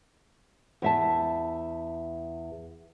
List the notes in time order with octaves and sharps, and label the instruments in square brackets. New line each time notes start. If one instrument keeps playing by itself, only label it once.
[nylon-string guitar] E2 E5 A5